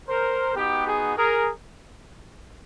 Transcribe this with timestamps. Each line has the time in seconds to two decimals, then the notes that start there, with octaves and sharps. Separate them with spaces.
0.08 A#4 C5
0.55 B3 D#4 F#4 G4
0.86 G#4
1.17 G#4 A#4